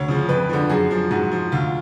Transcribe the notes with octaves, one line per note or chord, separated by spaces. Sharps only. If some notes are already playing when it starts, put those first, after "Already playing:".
Already playing: D2 C#5
C#3 F3
F2 B4
D3 F3
F#2 G#4
F3
G#2 F#4
F3
D2 F4